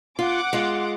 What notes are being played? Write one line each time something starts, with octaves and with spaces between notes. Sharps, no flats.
F4 F#5 D6
G#3 F4